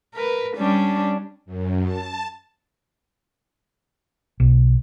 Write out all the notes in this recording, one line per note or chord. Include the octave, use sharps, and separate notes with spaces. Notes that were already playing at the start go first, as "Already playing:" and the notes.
A#4 B4
G3 C#4 D4
F#2
A5
B1